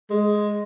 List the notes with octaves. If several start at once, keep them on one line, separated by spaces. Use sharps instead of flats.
G#3